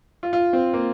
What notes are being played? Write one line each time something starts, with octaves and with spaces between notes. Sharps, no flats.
F4
F4
C4
A#3